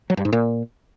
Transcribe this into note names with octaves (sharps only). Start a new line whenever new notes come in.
F#3
G2
G#2
A#2